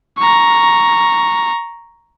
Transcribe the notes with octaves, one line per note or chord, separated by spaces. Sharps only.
A#5 C#6